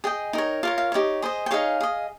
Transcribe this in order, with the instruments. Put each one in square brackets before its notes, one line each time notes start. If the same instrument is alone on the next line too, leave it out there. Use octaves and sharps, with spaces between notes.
[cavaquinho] G#4 D#5 G5
D#4 A#4 C#5
F4 A#4 C#5 F5
F5
D#4 G4 A#4 C#5
G#4 C5 D#5
G5
D#4 G#4 C#5 F5
G#4 D#5